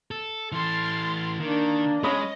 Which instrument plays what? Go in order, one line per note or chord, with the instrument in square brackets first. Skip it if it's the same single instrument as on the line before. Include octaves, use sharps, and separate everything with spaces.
[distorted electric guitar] A4
[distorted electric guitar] E3 A4 [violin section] C6 F6 A6
[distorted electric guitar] D#3 [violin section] A#3 [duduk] D4
[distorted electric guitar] G#3 [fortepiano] C#4 B5 D#6 [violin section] D#5